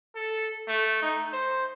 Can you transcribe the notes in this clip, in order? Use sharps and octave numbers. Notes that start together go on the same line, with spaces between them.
A4
A3
D#4
C5